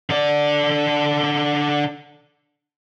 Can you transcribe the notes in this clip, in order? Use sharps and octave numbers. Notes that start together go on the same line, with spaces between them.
D3 D5